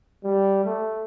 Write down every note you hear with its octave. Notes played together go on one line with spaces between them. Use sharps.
G3
A3